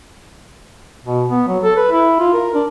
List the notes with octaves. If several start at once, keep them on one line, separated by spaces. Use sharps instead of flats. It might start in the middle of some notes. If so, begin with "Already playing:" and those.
B2
B3
F#3
A4
B4
E4
F4
A#4
D4